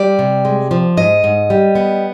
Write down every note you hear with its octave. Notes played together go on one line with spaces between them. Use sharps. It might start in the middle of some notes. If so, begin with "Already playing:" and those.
Already playing: G3 D5
C3
G#3
F3
G#2 D#5
G#2
G3
B3